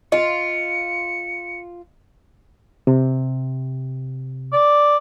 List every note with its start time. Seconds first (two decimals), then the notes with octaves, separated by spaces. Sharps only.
0.12 F4 D#5 G#5 C#7
2.87 C3
4.53 D5